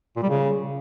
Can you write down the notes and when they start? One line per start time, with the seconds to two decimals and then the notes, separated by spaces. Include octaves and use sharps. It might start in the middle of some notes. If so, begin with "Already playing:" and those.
0.17 A#2
0.23 G3
0.29 C#3